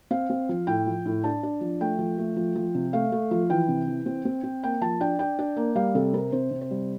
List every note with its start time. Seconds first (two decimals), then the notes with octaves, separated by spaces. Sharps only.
0.11 C4 F5
0.30 C4
0.49 F3
0.67 A2 G5
0.86 F3
1.05 A2
1.24 D4 A5
1.43 D4
1.61 F3
1.80 A3 G5
1.99 F3
2.18 A3
2.36 F3
2.56 F3
2.75 C3
2.93 A3 F5
3.12 A3
3.31 F3
3.50 E3 G5
3.68 C3
3.88 E3
4.06 C4
4.25 C4
4.44 C4
4.63 A#3 G5
4.81 F3 A5
5.00 D4 G5
5.19 D4 G5
5.39 D4
5.57 A#3
5.75 G3 F5
5.95 C3 A4
6.13 C4 A#4
6.32 C3 C5
6.51 C3
6.61 C5
6.71 G3